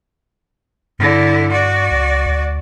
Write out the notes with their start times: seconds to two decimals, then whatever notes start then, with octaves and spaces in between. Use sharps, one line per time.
0.99 G2 D3 E4
1.51 F#4 D5
1.91 C#2
2.26 D2